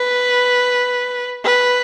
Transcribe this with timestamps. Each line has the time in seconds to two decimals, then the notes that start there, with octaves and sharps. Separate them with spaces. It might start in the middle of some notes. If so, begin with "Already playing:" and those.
Already playing: B4
1.45 B4